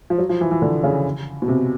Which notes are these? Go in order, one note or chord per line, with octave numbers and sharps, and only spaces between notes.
F3
F#3
F3
E3
E3
D3
C#3
B2
C3